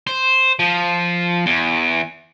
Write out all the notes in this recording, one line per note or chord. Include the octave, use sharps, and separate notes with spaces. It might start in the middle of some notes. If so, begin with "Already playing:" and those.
C5
F3
E2